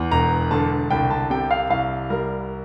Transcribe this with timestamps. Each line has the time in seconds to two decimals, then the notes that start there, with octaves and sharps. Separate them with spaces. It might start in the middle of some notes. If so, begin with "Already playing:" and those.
Already playing: E2
0.11 E1 A#5
0.51 D3 A5
0.91 C2 G5
1.10 A5
1.30 C3 G5
1.51 F5
1.70 C2 F5
2.10 G3 A#4